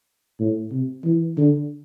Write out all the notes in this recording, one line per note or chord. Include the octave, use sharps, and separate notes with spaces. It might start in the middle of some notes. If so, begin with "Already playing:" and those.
A2
C3
E3
D3